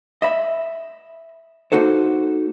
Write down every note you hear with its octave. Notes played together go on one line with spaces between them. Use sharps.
D#5 E5 B5
A#3 D#4 F#4 A4 C5